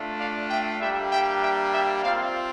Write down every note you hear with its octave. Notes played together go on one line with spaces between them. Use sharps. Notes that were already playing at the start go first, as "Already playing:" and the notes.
Already playing: A3 D4 F4
D5 F5
E5 G5
G3 A#3 D4 G4 E5 G5
E5 G5
E5 G5
E5 G5
C4 F4 D5 F5